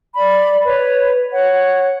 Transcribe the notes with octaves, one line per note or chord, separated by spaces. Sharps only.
D5 B5
B4 C#5
C#5 F#5